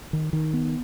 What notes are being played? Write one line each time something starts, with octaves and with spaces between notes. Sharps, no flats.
D#3
D#3
B3